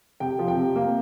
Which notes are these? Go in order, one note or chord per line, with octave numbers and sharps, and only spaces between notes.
C3 G5
F3
G5
C3
A#3